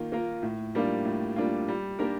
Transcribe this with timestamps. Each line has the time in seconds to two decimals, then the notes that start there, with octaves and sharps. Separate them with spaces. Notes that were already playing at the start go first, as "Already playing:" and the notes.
Already playing: D#3 A#3 F4
0.12 A#3 F4 A#4
0.43 A2
0.75 G3 A#3 D4 F4
1.05 A2
1.36 G3 A#3 D4 F4
1.68 G3
1.99 A#3 D4 G4 A#4